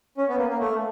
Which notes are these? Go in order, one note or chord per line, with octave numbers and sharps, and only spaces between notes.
C#4
B3
A#3
A#3
A3